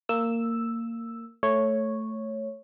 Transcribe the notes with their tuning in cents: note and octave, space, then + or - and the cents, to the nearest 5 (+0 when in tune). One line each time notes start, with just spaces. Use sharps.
A#3 -20 E6 +0
A3 +0 C#5 -5